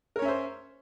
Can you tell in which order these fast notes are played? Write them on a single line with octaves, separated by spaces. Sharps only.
A#4 C#5 C#4 E5 C5